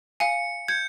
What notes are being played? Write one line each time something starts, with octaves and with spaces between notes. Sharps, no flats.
F5 G#5 C#7
G6 G#6 C#7